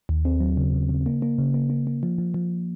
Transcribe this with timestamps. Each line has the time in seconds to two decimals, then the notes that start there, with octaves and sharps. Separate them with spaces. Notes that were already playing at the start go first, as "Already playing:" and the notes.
0.09 D#2
0.25 C4
0.40 F#3
0.57 C#3
0.74 C#3
0.89 C#3
1.06 A#3
1.22 A#3
1.38 C#3
1.54 A#3
1.70 A#3
1.87 A#3
2.03 F3
2.18 F3
2.34 F3